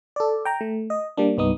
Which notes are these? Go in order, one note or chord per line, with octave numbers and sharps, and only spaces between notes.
A4 D5
G5 A#5
A3
D#5
G3 A#3 D4
C2 G2 B3 D#4 D#6